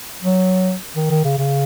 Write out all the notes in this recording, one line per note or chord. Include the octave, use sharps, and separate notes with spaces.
F#3
D#3
D#3
C#3
C#3